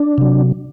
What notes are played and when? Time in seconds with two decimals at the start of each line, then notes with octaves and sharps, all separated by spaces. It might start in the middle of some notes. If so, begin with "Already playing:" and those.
Already playing: D4
0.18 C3 F#3